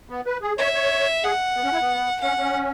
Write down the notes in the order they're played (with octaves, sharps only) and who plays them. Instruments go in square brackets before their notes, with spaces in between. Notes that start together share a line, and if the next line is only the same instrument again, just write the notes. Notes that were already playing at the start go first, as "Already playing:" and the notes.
[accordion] B3
B4
G#4
[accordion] C#5 [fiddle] E5
[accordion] C#5
[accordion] G#4 [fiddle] F#5
[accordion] B3
C#4
E4
B3
[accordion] C#4 [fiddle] F#5
[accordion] C#4